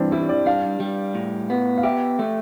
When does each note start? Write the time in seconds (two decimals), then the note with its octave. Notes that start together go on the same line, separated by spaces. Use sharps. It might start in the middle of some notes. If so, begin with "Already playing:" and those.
Already playing: G2 E3 C4 D4 E4
0.12 G3 E4
0.29 D5
0.46 D4 F5
0.80 G3
1.15 A2
1.50 B3
1.78 F5
1.83 G4 E5
2.19 A3